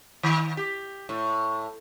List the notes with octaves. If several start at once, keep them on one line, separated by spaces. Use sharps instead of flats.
D#3
G4
A2